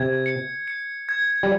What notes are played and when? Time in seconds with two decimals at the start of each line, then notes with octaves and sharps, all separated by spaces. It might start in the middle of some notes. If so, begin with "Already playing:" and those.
Already playing: C3 G#6
0.26 C#7
0.68 C#7
1.09 G#6
1.43 G3